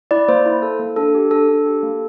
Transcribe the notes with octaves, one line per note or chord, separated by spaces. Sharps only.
E4 D5
A#3 C5
E4
A4
A#3
D4 A4
G4
D4 A4
D4
G4
A#3